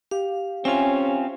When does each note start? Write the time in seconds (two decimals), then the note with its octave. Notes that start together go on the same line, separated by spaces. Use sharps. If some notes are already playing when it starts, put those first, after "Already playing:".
0.11 G4 F5
0.65 C4 C#4 F4 E5 G#5